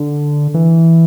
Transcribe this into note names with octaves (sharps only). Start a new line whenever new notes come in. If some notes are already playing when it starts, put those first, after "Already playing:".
Already playing: D3
E3